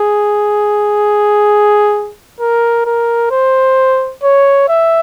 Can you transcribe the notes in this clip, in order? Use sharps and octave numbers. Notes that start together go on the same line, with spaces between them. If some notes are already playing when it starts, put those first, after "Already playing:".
Already playing: G#4
A#4
A#4
C5
C#5
E5